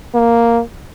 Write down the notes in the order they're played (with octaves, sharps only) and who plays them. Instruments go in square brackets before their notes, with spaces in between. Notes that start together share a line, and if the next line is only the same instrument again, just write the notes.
[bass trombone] A#3